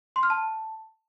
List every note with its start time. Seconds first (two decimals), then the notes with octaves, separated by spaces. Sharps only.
0.16 C6
0.23 F6
0.30 A5